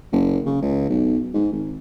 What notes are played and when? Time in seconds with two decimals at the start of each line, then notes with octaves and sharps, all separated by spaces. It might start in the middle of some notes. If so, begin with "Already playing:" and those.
0.12 F#1
0.46 C#3
0.62 C#2
0.89 B1
1.34 G#2
1.52 G#1